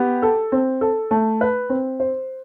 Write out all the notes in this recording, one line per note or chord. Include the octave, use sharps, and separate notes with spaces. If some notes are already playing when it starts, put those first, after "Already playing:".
Already playing: B3 G4
A4
C4
A4
A3
B4
C4
C5